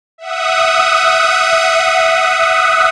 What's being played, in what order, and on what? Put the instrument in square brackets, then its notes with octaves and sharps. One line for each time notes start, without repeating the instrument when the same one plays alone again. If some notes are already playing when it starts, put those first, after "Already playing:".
[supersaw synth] E5 F#5 D#6